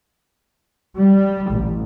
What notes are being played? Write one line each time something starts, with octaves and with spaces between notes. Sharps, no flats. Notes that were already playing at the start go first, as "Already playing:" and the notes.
G3
A1